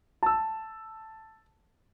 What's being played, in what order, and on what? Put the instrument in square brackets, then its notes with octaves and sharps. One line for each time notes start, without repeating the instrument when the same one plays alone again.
[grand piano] A5 E6